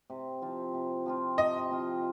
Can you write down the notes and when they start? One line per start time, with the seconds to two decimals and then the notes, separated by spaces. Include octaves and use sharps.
0.10 C3
0.42 F3 C4 F4
0.74 C3
1.06 F3 C4 F4
1.38 C3 D#5
1.71 F3 C4 F4